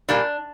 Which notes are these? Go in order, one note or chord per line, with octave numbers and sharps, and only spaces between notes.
A#2 G3 A#3 D4